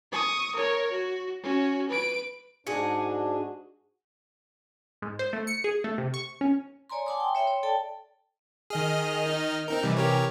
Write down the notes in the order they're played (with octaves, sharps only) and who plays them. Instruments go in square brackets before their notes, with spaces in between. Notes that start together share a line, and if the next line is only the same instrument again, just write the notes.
[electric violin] C#6 D#6
A#4 C#5
F#4
C#4 F#4
B4 D7
[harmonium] G#2 D4 [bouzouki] F#4 G#4
[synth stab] G#2
C5
A3
C#7
G#4
A3
C3
C#6
C#4
[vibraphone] C#5 D5 G#5 A#5 C6
F#5 G#5 A5 C6 D6 D#6
G5 C6
C#5 E5 G5 B5 C6
C#5
A4 D5 G5 A5
[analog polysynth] D#3 D#5 F6 [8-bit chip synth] G#4
[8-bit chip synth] D#4
C4 D#4 A#4
[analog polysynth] C3 E3 [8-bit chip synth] G3
[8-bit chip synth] G4 A#4 C#5